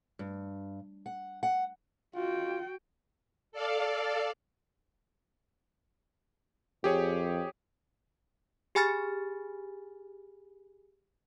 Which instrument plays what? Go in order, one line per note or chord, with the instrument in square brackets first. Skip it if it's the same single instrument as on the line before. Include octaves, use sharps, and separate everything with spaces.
[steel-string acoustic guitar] G2
F#5
F#5
[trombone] F4 [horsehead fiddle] F#4 G5
[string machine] A4 D5 F5
[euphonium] F2 [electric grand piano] G4 G#4 C#5
[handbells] G4 G#4 G#5 B5 F6 A6